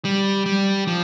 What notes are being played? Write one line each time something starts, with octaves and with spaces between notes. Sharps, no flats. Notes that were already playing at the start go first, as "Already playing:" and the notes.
G3
G3
F3